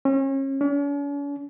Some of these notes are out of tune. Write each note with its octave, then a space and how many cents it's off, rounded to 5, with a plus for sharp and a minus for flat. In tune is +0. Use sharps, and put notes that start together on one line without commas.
C#4 -35
C#4 +45